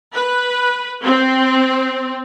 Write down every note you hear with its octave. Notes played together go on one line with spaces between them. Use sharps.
B4
C4